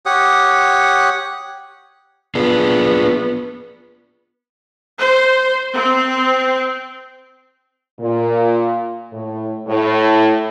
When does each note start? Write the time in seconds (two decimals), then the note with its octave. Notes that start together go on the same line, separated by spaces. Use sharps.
0.06 G4 C#5 F#5 D#6
2.35 B3 D4 F4 G#4
4.98 C5
5.75 C4
8.00 A#2
9.13 A2
9.67 A2